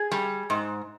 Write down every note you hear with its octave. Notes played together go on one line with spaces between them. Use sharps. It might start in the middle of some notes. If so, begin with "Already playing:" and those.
Already playing: G#4
G3
G#2